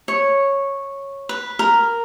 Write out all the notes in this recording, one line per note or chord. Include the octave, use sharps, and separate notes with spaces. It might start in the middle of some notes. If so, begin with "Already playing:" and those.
C#5
B4
A#4